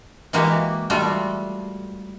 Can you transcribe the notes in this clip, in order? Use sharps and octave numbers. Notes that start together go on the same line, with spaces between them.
E3 G#3 A#3 F#4 G4
G3 A3 F4 F#4